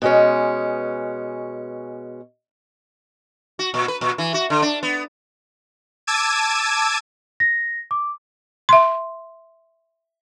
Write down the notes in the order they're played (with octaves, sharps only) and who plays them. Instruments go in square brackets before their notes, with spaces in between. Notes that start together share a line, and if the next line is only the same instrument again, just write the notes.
[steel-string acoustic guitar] B2 G#3 C#4
[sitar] F#4
A#2
B4
A#2
E3
F#4
D3
D4
B3
[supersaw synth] A5 D6 E6 G#6 D#7
[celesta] A#6
D6
[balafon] E5 C6